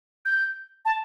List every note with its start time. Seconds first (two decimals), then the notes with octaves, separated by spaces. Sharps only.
0.25 G6
0.85 A5